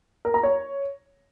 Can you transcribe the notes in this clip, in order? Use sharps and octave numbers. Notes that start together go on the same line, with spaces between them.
A#4
A#5
C#5